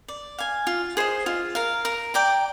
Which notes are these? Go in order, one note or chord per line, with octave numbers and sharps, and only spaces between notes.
D5
F5 G#5
F4
G#4 C5 D#5
F4
A#4 F5
A#4
D5 G5 A#5